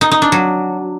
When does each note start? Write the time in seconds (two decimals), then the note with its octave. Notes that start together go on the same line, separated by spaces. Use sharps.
0.01 D#4
0.11 D#4
0.22 D4
0.32 F#3